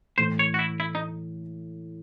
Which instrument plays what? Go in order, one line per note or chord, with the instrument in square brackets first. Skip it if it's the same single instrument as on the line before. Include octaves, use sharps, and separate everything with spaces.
[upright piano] A2 E3 A3 [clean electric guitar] C5
[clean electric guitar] C#5
F#4
E4
E4
D#4